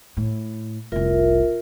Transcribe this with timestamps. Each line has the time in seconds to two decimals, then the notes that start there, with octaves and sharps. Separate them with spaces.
0.17 A2
0.92 F1 C2 F4 A#4 E5